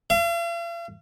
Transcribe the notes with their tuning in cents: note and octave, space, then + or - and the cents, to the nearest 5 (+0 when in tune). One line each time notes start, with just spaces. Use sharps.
F5 -45